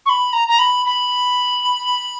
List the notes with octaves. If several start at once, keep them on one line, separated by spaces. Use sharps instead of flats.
C#6
B5
A#5
A#5
B5
B5